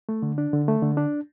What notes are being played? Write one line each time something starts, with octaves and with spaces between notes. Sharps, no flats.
A3
D3
D4
D3
A3
D3
D4